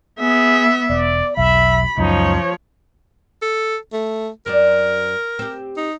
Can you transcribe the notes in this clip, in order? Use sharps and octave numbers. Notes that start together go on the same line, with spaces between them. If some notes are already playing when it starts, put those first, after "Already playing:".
B3 G#4 E5
E1 D5
E1 B1 E5 B5
C#2 F#2 C#3 F3 D#4 C#5
A4
A3
F#2 C4 A#4 D5
C4 G4
D#4